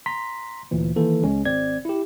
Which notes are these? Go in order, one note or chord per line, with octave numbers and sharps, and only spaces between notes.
A#5 C6 B6
D2 A#2 E3
D#3 E3 A#3 A4
C#2 G#3 C#4
G#1 C4 D5 G#6
E4 G4